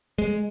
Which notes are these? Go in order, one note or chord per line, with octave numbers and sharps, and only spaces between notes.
G#3